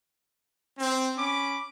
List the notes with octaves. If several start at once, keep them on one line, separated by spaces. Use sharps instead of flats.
C4
C#4 B5 D6